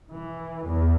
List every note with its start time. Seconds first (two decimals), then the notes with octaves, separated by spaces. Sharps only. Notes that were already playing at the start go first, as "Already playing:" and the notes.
0.11 E3
0.66 E2